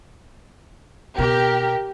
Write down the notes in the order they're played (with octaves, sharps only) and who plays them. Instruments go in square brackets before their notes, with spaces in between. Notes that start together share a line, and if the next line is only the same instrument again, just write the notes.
[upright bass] B2 [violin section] G4 [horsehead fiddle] A#4